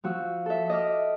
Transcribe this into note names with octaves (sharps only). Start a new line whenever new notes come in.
F3 F#4 E6
A4 E5
D#5 E5 D6 F6